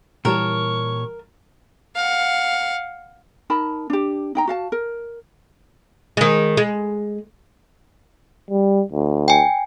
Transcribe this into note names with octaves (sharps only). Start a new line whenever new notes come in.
A#2 E3 G3 A#4 C#5 A5 C#6
F5 F#5
D#4 A#4 A5 B5
D4 G4
D#4 G5 A#5
F#4 F5 A5
A#4
D#3 G#3
G#3
G3
D2
G5 G#5